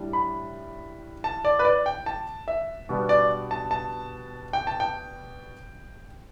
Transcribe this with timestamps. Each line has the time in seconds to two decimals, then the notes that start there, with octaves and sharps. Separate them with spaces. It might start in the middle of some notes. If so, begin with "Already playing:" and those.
Already playing: A2 G3 D4
0.13 B5
1.24 A5
1.45 D5
1.59 B4
1.65 D5
1.86 G5
2.06 A5
2.48 E5
2.89 B2 G3 B3 D4
3.09 D5
3.51 A5
3.71 A5
4.53 G5
4.67 A5
4.80 G5